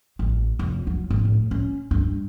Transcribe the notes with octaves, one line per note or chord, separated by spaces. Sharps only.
A1
F1
F#3
G#1
A2
C#4
G2